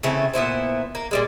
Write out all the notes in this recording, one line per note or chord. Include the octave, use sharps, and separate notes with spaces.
C#3 E3 A3 C4
A#2 B3 E4 C5
A#3
A#2 G3 G#3